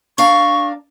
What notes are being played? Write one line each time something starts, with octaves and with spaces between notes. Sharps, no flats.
D4 A#4 F5 C#6